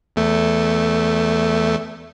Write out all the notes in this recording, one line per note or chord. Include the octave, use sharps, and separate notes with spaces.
E2 A3